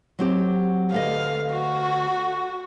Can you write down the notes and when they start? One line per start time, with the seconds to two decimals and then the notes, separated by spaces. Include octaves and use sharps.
0.19 F#3 C4 G4
0.92 D2 B3 D#5 F5
1.53 F#4